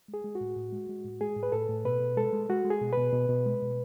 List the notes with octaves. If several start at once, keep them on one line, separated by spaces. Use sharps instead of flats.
G#3
G#4
G#3
F#4
A2
A2
G#3
G#3
A2
G#3 G#4
A2
B4
A2 A4
A2
B2 B4
B2
G#3 A4
G#3
G#3 F#4
G#3
G#4
B2
B4
B2
B2
B2
G#3
B2